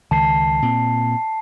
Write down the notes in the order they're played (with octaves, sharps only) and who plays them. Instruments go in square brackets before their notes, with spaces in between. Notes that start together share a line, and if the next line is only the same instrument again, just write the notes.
[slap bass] C#2 D#3 [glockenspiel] A5 C7
[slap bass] A#2 C4